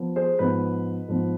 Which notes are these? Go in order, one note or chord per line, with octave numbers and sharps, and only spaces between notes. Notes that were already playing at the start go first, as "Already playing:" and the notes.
Already playing: F3 B3
G#4 C5
G#2 F3 B3 B4
G#2 F3 B3